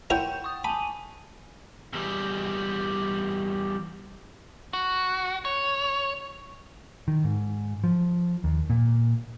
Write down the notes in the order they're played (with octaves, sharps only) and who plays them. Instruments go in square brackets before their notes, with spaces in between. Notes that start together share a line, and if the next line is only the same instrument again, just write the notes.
[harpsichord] E4 A#4 C#5 [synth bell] F#5 G5 G6
[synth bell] C#6 D#6
[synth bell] G#5 A5 D#7 [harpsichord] B5
[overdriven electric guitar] E2 G3
[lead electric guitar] F#4
C#5
[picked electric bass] D#3
G#2
F3
D#2
A#2